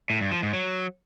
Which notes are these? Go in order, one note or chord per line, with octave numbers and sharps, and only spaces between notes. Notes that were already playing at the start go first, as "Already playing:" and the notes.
A2
G2
F3
G#2
F#3